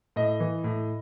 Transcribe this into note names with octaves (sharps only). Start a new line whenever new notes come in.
A2 D#5
E3
A2